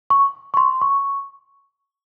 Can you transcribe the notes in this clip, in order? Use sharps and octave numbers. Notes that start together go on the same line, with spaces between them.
C#6
C#6
C6
C#6